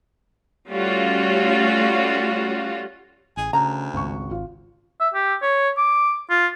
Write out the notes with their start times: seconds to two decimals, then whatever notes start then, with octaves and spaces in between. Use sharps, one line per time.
0.69 G3 A3 C#4 F4 F#4
3.37 A1 G#4
3.53 D2 C#3 A#5
3.94 G#1 C#2 C#6
4.31 G#1 F4
5.00 E5
5.14 G4
5.42 C#5
5.78 D6
6.30 F4